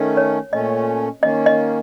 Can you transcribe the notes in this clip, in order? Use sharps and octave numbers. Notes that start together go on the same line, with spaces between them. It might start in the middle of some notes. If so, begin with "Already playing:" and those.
Already playing: D#3 A3 C#4
C#5
A#2 A3 C#4 D#5
D#3 A#3 C#4 D#5
D#5